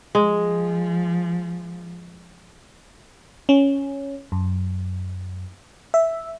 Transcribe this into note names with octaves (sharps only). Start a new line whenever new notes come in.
F3 G#3
C#4
F#2
E5